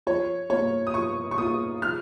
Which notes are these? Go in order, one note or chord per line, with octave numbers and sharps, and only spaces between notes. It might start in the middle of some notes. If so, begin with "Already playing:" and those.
F3 C#5
A#3 F4 C#5
D#6
F3 C#6
C#6
A#3 F4 D#6
F3 F6